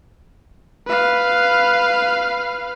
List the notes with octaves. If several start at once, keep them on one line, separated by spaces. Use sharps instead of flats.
B4 F5